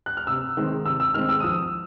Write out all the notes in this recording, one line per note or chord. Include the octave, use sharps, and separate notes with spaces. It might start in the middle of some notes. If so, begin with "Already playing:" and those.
F#6
F6
C3 E6
D#3 G#3 C4
C3 E6
E6
D#3 G#3 C4 F6
E6
D#6
F3 E6